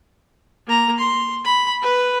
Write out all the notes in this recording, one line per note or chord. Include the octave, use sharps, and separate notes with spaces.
A#3 A#5
C6
B5
B4